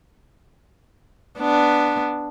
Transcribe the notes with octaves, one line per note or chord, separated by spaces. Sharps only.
B3 D4